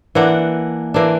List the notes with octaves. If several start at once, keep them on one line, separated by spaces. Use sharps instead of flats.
E3 A#3 D4 F#5
E3 A#3 D4